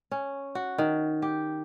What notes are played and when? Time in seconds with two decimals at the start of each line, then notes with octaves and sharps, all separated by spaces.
0.11 C#4
0.55 F#4
0.78 D#3
1.22 G4